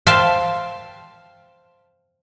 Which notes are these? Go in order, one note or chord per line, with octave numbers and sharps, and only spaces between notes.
C5 E5 F5 G5 A5 C6